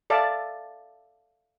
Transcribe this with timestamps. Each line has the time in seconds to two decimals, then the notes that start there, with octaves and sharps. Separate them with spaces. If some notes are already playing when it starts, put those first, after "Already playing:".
0.10 A4 D5 E5 F5 A5